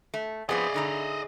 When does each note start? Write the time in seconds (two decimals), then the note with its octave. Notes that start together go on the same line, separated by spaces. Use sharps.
0.14 A3
0.49 F3 B3 C4 G#4 D5 D#5
0.74 D3 D#4 A#5